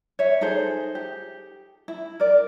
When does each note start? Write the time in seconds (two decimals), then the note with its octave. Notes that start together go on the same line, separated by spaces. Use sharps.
0.19 C#5 E5
0.41 D#4 G#4 A4 C5
0.95 G4
1.88 E4
2.20 A#4 D5